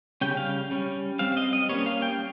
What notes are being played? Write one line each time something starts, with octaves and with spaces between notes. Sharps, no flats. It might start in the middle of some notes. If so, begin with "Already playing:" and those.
C#3 G3 C#4 G5
F5
G3 C#4
G3 C4 F5
F5
D#5
D#5
G3 A#3 C#4 C#5
F5
G5